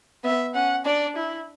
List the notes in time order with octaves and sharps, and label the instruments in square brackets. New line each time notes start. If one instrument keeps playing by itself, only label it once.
[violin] B3 [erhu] E5
[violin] C#4 [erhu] F#5
[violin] D4 [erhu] D5
[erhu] E4